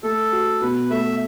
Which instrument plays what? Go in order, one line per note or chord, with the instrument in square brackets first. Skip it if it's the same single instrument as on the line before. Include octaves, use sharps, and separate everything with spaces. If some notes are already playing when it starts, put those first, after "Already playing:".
[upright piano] A3 [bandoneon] A4
[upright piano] F#4
[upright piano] B2 [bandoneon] B4
[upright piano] A3 [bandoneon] E5